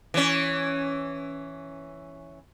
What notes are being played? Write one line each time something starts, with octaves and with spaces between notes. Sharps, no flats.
E3 C#4